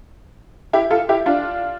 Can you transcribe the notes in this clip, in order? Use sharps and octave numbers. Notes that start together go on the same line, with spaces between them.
E4 G4
F4 A4
E4 G4
D4 F4